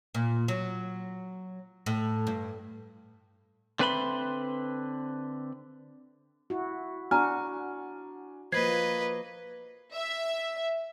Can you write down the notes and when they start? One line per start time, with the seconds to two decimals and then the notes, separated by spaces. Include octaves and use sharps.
0.15 A#2
0.48 F#3
1.86 A2
2.27 G2
3.79 D3 C4 B4 E5 B5 C6
6.50 E4 F#4
7.11 D4 F#4 G#5 A#5 F6
8.52 F3 A#3 B4 C5 D#5 G#6 C7
9.94 E5